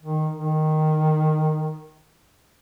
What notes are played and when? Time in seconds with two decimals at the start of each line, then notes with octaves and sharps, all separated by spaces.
0.02 D#3
0.36 D#3